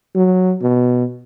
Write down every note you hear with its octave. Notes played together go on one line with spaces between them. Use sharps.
F#3
B2